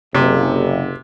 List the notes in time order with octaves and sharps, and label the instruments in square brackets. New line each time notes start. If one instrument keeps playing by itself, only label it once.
[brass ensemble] F#1 [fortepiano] C3